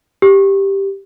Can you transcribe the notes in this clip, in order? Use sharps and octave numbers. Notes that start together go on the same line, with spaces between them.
G4